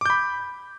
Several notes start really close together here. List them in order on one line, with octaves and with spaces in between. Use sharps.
D6 G6 B5